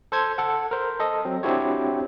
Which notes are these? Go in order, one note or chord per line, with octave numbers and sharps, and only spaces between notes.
A4 C5 G#6
A4 F#5
A#4 C5
A4 D#5
F#3 C4
C4 D4 E4 F#4 G4 C#5